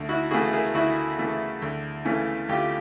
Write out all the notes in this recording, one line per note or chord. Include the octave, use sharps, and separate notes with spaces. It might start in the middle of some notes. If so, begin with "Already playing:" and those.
Already playing: D2
E4 F#4
C#3 E3 A3 F#4 G#4
G#4 A#4
D2 E4 F#4
C#3 E3 A3
D2
C#3 E3 A3 C#4
D2 F4 G4